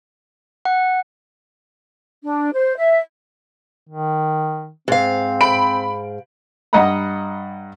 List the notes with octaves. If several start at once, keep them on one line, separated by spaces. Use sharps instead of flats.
F#5
D4
C5
E5
D#3
G#2 C4 F5
B5 D7
G2 D#5 F#5 A#5 B5